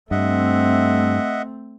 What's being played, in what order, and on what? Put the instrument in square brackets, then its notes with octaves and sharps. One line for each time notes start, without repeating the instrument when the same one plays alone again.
[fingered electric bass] G2 [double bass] A3 C4 [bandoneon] D#5 E5 F#5